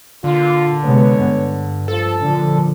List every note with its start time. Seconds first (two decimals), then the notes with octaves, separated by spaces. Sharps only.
0.24 A#2 D3 F4
0.85 C3 G#3 B3 C#5
1.23 G2
1.88 F3 A4
2.22 A#2 D3 F3 D4